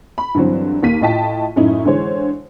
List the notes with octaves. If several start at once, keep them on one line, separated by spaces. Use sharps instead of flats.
B5
G2 D3 E3 F#3 C4
D#2 A#3 B6 D#7
A2 F4 D#5 G5 A5 B6
F#2 A2 C#4 D#4 E4
D3 E3 G#3 C5 C#5